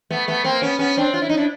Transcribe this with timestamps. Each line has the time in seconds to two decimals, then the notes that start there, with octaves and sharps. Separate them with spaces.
0.11 A3 B3
0.28 A3 B3
0.44 A#3 C4
0.62 B3 C#4
0.79 B3 C#4
0.97 C4 D4
1.14 F4
1.22 E4
1.29 D#4
1.37 D4 E4